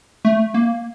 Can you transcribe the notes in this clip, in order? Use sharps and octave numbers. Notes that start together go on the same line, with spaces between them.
A3
A#3